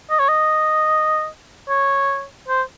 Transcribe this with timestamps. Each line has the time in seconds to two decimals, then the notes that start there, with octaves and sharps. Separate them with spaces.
0.10 D#5
0.19 C#5
0.28 D#5
1.68 C#5
2.48 C5